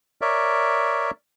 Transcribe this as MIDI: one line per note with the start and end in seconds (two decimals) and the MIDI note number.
0.21 1.11 70
0.21 1.11 73
0.21 1.11 74
0.21 1.11 76